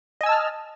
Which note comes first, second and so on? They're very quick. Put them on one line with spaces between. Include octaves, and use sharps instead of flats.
D#5 G#5 E6 A5 F6